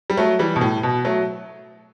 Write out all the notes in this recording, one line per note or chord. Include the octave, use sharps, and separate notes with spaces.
G3
F#3 A3
E3 G3
B2
A2
B2
F#3 A3